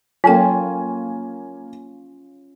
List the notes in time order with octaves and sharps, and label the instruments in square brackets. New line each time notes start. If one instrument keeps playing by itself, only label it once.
[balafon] F#3 A4 G5 [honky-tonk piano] A#3 G#5 [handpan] C#4 F4